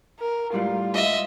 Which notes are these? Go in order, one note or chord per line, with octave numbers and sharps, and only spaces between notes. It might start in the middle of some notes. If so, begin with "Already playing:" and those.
A#4
A2 G3 G#3 F4
D#5 E5